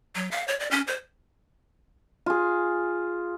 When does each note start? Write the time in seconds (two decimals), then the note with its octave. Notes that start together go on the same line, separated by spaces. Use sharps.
0.15 F#3
0.31 F5
0.48 C#5
0.59 D5
0.71 C#4
0.87 C5
2.26 F4 G#4